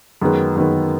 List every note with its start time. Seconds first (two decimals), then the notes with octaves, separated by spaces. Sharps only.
0.22 F#2 D#3 G#3 B3
0.56 F#2 D#3 G#3 B3